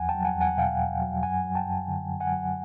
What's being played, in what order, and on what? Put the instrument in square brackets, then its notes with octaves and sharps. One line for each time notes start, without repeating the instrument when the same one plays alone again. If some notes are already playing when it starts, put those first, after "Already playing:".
Already playing: [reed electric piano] E2 F3 F#5 G#5
G5 A5
F#3
F#5 G#5
E2
F#5 G#5
B2 F5 G5
E2
F#3
F#2 F#5 G#5
F#3
G5 A5
F#2
D3
F#2
F#5 G#5
F#3